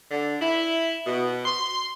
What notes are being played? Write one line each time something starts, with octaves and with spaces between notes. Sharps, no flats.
D3
E4
B2
C6